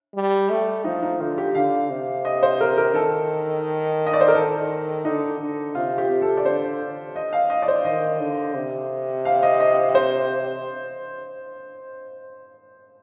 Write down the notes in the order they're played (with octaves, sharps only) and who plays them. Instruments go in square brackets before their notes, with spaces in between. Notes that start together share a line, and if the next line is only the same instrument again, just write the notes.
[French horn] G3
A3
[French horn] F3 [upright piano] D#4
[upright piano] D#4
[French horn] D3 [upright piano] F4
[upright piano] G4
[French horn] D3 [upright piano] F5
[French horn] C3
[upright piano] D#5
C5
A#4
A#4
[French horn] D#3 [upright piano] A4
[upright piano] D#5
D5
C5
A#4
[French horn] D#3 [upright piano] A4
[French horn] D3 [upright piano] D#4
[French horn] D3
[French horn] C3 [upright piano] F4
[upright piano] G4
[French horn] C3
[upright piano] A4
D5
[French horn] D3 [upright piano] C5
[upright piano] D#5
F5
D#5
D5
C5
[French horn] D#3 [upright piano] D#5
[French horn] D3
C3
[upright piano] F5
D#5
D#5
C5